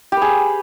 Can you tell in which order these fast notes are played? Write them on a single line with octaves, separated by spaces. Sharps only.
G4 B4 G#4